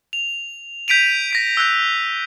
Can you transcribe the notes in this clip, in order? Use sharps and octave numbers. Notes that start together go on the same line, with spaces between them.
F7
G6 B6 D7 D#7 F7
A#6 B6 D7
E6 F#6 G6 A#6